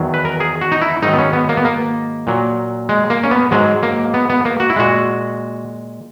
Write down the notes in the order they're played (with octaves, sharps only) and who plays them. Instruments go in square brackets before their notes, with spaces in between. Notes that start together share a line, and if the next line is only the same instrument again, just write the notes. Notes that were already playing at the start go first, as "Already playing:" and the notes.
Already playing: [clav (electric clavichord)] E2 D#3 F#3
B4
A#4
G#4
F#4
D#4
E4
G#2 D#3 F#3 D#4
B3
C#4
B3
A#3
B3
A#3
A#2 F#3
G#3
A#3
C#4
B3
G#2 F#3 G#3
A#3
B3
B3
A#3
F#4
E4
A#2 G#3 F#4